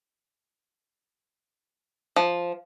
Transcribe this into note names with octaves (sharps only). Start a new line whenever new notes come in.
F3